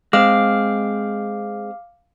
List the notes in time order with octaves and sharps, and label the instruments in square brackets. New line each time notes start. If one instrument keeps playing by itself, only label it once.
[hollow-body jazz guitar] G#3 C4 [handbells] F5 D6 F6